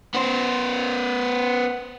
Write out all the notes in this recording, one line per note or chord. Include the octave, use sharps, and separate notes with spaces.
B3 C5